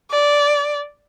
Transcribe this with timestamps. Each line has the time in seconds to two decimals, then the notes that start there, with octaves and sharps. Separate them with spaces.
0.11 D5